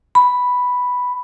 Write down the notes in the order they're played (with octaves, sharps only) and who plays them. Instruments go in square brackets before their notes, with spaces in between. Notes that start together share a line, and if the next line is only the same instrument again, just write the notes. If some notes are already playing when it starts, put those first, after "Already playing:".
[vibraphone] B5